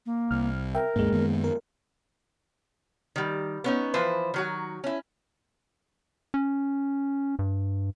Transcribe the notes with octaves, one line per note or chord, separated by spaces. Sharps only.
A#3
C2 F6
A#4 E5 G5
D#2 G#2 G#3 A#3
F#2 D#3 B3
A#4
D#3 G3
B3 C#4 D#4
E3 F3 B4 C5
D#3 F#3 F#4
C#4 E4
C#4
G2